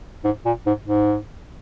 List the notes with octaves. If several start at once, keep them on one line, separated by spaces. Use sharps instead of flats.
G#2
A#2
G#2
G#2